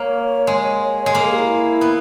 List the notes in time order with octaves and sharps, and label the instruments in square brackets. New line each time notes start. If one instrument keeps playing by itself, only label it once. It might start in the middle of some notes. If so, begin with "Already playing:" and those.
Already playing: [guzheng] A#3 [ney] C#5
[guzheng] G#3
G#3
[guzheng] A#3 [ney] A#4
[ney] G#4
G4
E4
[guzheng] B3